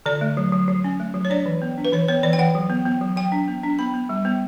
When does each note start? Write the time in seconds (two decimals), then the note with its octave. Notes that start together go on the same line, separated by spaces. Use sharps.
0.06 D3 D5
0.21 A3
0.37 F#3
0.52 F#3
0.68 F#3
0.84 C#4
1.00 A3
1.14 F#3
1.25 C#5
1.30 D4 D5
1.46 E3
1.62 B3
1.78 D4
1.85 B4
1.92 E3 C#5
2.08 B3 C#5
2.23 E3 D5
2.33 G5
2.38 E3 F#5
2.55 F#3
2.70 B3
2.85 B3
3.01 F#3
3.16 F#3 G5
3.32 D4
3.48 B3
3.63 D4
3.79 B3 B5
3.94 B3
4.09 G3
4.25 B3